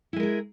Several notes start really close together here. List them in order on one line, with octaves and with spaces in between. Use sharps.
E4 G#3 A#4 G#4